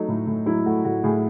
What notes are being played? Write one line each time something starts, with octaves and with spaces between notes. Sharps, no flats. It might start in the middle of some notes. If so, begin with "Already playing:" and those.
Already playing: F#3 A3 D#4
A2
A2
F#3 E4
A3 F#4
A2 F#4
A2 G#4